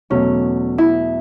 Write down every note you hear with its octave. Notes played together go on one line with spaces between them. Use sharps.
E2 B2 F#3 A3 C#4
E4